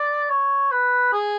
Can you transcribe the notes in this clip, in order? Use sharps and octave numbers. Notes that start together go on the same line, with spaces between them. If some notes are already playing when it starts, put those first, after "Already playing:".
Already playing: D5
C#5
B4
G#4